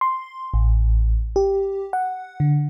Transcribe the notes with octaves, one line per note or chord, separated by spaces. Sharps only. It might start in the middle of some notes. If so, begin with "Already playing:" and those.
C6
A1
G4
F#5
D3